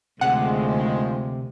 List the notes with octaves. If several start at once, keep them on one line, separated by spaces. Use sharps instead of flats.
D2 C3 D#3 F3 G#3 F#5